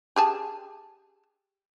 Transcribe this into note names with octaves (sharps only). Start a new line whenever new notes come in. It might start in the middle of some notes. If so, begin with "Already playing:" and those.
G4 G#4 A5